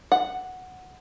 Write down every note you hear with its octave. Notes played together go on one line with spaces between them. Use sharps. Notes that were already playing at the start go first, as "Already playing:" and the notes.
F#5